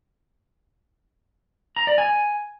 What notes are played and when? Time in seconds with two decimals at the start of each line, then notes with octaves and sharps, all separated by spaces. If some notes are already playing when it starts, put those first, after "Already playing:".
1.76 A#5
1.87 D5
1.98 G#5